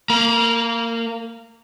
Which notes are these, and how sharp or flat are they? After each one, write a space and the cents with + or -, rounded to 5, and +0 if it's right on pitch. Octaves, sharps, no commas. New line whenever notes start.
A#3 -20 A#5 +40